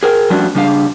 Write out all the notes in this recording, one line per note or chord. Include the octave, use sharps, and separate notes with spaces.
G#4 A#4 G5
F3 G3 A3 C#4 D4 F#4
C#3 G3 D4 C5 F5